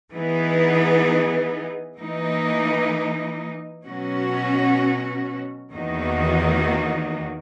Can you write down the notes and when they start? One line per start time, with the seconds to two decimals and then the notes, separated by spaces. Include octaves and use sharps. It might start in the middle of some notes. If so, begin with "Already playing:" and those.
0.13 E3 B3 D#4 G#4
2.00 E3 A#3 D#4
3.86 B2 F#3 C#4 F#4
5.73 E2 D#3 A#3 D#4 F#4